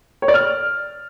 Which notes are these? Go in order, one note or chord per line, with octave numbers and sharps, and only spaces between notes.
C#5
D5
F6